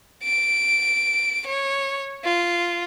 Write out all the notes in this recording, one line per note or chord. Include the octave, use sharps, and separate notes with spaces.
D7
C#5
F4